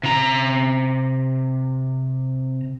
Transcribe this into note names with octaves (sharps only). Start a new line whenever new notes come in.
C3 A#5